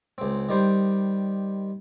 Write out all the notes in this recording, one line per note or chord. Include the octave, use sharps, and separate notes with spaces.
C#2 C4
D#3 G3 C5